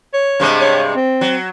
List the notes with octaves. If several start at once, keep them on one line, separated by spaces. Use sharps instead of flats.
C#5
G2 C3 G#3
C#5
C4
F#3